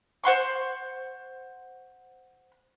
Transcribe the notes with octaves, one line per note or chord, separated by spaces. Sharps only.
C5 F#5 C6 C#6